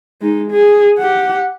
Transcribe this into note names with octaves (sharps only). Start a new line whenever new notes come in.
G#3 D#4
G#4
G4 F#5